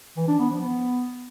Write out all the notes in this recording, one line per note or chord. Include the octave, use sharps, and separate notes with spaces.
E3
D4
B3
F3
B3